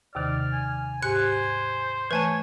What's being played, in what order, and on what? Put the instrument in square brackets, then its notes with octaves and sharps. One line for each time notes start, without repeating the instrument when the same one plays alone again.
[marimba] D#2 C3 D#3 [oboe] D5 [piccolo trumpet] F6
[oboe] G#5
[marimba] G#2 G4 [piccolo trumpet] C5 [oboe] G#5 [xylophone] F#6 C#7
[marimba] E3 A3 [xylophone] B4 G#5 A5 [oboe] C#5 [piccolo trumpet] G#6